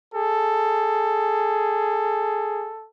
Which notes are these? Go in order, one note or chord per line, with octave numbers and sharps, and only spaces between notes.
G#4 A4